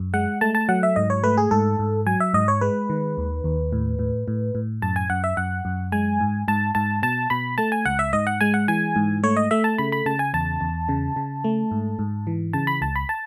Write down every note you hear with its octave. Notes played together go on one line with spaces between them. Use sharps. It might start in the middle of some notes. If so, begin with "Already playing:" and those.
Already playing: F#2
G#3 F#5
A3 A5
A5
F#3 F#5
E5
G#2 D#5
C#5
A3 B4
G#4
G#2 A4
G#2
F#3 G#5
E5
G#2 D#5
C#5
G#3 B4
D#3
D#2
D#2
A2
A2
A2
A2
F#2 A5
G#5
F#2 F#5
E5
F#2 F#5
F#2
G#3 G#5
G#2
G#2 A5
G#2 A5
B2 A5
B2 B5
A3 A5
G#5
C#2 F#5
E5
G#2 D#5
F#5
G#3 G#5
F#5
E3 G#5
G#2
A3 C#5
D#5
A3 E5
A5
C#3 B5
B5
C#3 A5
G#5
E2 A5
E2
C#3
C#3
A3
G#2
G#2
E3
C#3 A5
B5
C#2 A5
B5
A5